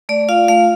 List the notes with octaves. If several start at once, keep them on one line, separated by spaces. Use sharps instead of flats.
A3 D5
F4 F5
A3 F5